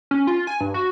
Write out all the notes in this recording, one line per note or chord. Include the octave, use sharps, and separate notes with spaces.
C#4
F4
G#5
G2
F#4